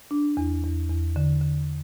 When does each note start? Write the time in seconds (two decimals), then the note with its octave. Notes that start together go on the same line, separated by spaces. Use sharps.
0.11 D4
0.37 E2
0.64 E2
0.89 E2
1.16 D3
1.41 D3